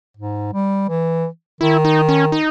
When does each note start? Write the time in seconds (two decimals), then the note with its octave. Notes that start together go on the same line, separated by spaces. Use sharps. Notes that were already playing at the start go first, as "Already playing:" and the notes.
0.17 G#2
0.53 G3
0.89 E3
1.61 D#3 E4
1.85 D#4
2.09 C#4
2.32 D#4